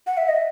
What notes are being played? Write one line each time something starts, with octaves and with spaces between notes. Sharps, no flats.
F#5
E5
D#5